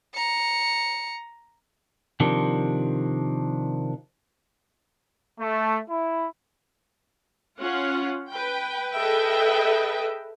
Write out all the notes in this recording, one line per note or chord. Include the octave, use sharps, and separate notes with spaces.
A#5 C#7
C3 D#3 F3 D4
A3
E4
C#4 F4 F#5
B4 G5
G#4 A4 B4 D#5 E5 G5